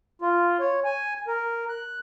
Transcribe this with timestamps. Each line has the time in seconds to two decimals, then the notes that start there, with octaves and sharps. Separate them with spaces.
0.22 F4
0.60 C#5
0.85 G#5
1.28 A#4
1.69 F#6